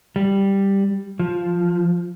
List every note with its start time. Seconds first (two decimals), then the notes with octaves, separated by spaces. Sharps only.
0.16 G3
1.19 F3